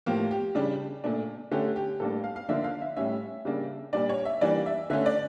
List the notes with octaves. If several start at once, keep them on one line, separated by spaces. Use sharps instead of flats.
A2 F3 A#3 G4
G4
C#3 G3 D4
A#2 A3 D4
D3 A3 C#4 G4
G4
A2 G3 A#3 D4 A4
F5
F5
D3 F3 A#3 D4 E5
F5
E5
A2 G3 C#4 E5
C#3 G3 A#3 D4
A#2 G3 D4 D5
C#5
E5
E3 G3 A#3 D4 D5
E5
D3 A3 C#4 E5
D5